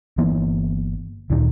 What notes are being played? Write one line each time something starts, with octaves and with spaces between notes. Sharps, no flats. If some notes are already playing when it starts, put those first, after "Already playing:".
G1 E3 A#3 B3
D2 A#2 D3 D#3